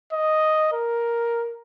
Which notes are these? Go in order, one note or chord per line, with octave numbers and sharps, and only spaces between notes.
D#5
A#4